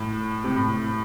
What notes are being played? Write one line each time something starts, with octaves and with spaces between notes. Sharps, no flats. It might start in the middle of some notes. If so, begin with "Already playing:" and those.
Already playing: A2
C3
A2